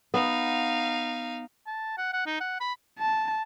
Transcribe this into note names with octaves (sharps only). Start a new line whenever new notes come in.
B3 D#4 F5
A5
F#5
F#5
D#4
F#5
B5
A5